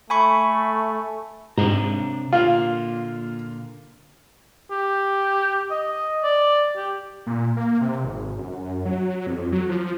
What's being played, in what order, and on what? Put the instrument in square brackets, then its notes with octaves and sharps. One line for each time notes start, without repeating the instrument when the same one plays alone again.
[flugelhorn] A3 [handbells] G#5 B5 C#6
[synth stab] G#2 [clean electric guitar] C3 D4 A#5
[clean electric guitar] A#2 D3 A#3 [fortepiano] F4
[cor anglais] G4
D#5
D5
G4
[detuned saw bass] A#2
A#3
C3
G#1
F#2
F#3
F2
F#3
F3